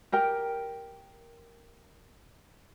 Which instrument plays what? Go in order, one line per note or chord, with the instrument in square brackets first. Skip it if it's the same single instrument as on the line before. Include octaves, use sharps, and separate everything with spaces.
[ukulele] G4 A#4 G5